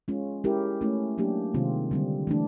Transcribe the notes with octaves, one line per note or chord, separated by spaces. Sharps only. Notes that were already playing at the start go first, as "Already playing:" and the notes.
G#3 C#4 F4
G#3 C#4 E4 G4 A#4
A3 C#4 E4
F#3 A#3 D4 G4
C3 D#3 G#3 C4 F4
D3 G3 C4
E3 A3 D4